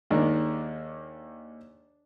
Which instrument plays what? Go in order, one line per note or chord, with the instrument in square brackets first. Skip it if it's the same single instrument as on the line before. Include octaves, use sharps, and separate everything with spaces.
[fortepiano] D#2 D#3 G#3 D4